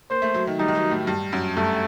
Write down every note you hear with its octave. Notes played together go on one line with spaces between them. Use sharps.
A#3 C5
A3
F#3
D#3
G3 D#4
D#3
F#3
A2
G2
F#2
G2 A3